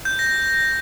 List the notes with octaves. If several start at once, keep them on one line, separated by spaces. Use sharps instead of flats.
G6
A#6